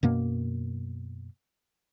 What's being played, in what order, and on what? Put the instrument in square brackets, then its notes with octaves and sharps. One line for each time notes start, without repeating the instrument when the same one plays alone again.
[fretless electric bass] F#2 B2 A#3